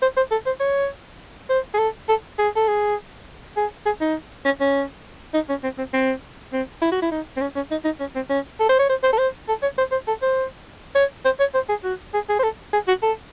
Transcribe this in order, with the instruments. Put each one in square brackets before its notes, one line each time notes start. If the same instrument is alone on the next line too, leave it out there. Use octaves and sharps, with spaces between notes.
[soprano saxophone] C5
C5
A4
C5
C#5
C5
G#4
A4
A4
G#4
A4
G#4
G#4
G#4
D#4
C#4
C#4
D#4
C#4
C4
C4
C4
C4
E4
F#4
E4
D#4
C4
C#4
C#4
D#4
D#4
C#4
C4
C#4
A4
C5
C#5
C5
C5
A4
C5
A4
C#5
C5
C5
A4
C5
C#5
C5
C#5
C5
G#4
F#4
G#4
G#4
C5
A4
G#4
F#4
A4